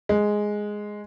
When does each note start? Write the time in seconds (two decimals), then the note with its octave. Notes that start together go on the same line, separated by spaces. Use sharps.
0.09 G#3